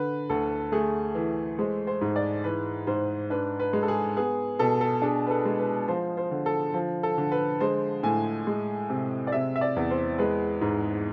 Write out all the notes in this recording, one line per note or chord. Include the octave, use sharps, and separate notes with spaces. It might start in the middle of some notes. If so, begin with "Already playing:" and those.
Already playing: D3 B4
D2 A4
A3 G#4
E3
G#3 C5
C5
G#2
D5
E3 B4
G#2 C5
D4 B4
B4
G#3
A4
G#4
B3 G#4
B2 A4
A4
D4 G#4
B4
A4
G#3
B4
F3 C5
C5
D3
A4
F3
A4
D3
B4
G#3 C5
A2 G#5
G#3
C3
D5
C3 E5
E5
D5
E2
C5
G#3 B4
G#2